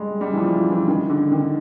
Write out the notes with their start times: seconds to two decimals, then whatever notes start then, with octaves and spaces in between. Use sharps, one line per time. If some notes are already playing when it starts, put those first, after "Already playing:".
Already playing: G3 G#3
0.21 G3
0.33 E3
0.37 F3
0.54 E3
0.71 E3
0.88 D#3
1.10 D3
1.32 D#3